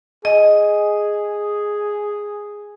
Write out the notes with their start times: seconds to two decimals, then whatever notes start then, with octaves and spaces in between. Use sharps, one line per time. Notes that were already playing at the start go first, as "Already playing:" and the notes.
0.25 G#4 D#5